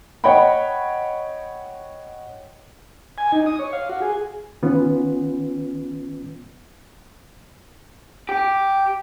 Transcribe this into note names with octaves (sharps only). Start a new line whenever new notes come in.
C#5 D#5 F#5 G5 B5
G#5
D#4
D#6
C#5
F5
F#4
G#4
D#3 B3 C#4 F4 B4
G4